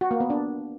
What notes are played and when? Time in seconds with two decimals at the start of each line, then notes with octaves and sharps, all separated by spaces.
0.01 F#4
0.11 A#3
0.20 B3
0.30 D4